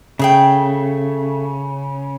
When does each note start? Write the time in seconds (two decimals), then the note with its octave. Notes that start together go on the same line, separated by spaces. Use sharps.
0.19 C#3 A3 G#4 G5